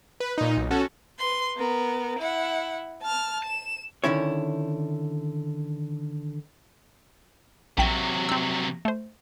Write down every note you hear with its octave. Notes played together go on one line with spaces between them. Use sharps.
B4
A#2 D#4
B1
C#4 F#4 A4
B4 C6
B3 A#4
E4 F#5
A5 F6
E7
D3 D#3 C#4 E4 C#5
A#1 C3 F#3 G5 B6
C4 E6
A3 C5